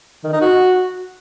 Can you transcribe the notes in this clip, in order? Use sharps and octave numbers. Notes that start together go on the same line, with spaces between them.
D#3
D#4
F#4